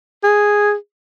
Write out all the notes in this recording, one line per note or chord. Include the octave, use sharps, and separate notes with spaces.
G#4